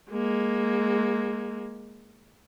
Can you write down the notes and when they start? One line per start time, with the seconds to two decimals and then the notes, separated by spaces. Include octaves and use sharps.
0.10 G#3 A#3